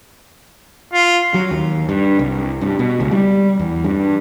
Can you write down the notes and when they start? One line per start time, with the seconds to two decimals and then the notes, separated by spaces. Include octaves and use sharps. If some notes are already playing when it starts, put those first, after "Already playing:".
0.93 F4
1.34 F#3
1.51 D#2
1.89 G2
2.19 C2
2.61 G2
2.79 B2
3.00 C#2
3.11 G3
3.59 E2
3.84 G2